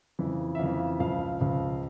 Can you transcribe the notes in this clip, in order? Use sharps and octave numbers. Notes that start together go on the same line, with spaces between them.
F2 C#3 E3
E5
F2 C#3 E3 F5
C#2 C#3 F3 F5
C#2 C#3 F3